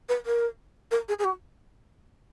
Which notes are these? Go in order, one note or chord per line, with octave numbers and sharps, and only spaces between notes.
B4
A#4
A#4
G#4
G#4
F#4